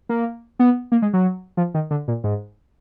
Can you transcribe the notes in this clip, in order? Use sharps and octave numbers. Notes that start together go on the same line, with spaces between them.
A#3
B3
A#3
G#3
F#3
F3
D#3
D3
A#2
G#2